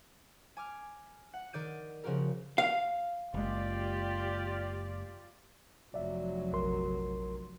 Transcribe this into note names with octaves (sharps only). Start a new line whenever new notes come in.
G#5 D6 F6
F#5
D#3 D5 G6 D#7
C#3 F3 F#4 G4 A#4
F5
F#1 G#3 F4 G4 D5
F1 F#3 D5 E5
A#1 A#4 C6